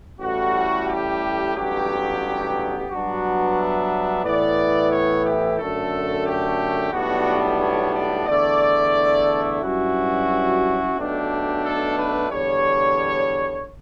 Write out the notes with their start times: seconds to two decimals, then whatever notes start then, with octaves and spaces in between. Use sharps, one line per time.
0.21 A1 A2 G3 F#4
0.88 G4
1.55 A1 G2 F#3 B3 G4
2.89 G2 F#3 B3 D4 F#4
3.56 E5
4.24 A2 E3 B3 E4 D5
4.91 C#5
5.24 G4
5.58 F#2 D3 A3 A4
6.25 G4
6.92 B1 A2 G3 B3 D4 F#4
7.59 C#5
7.93 D5
8.26 E2 D3 A3 E4 D5
9.61 G2 F#3 C#4 E4 F#4
10.95 B1 B2 A3 D4 G4
11.62 A4
11.96 B4
12.30 E2 D3 G3 C#5